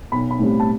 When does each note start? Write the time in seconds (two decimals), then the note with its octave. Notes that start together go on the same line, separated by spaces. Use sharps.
0.12 B1 B5
0.31 B5
0.39 A2 G3 C4
0.60 A5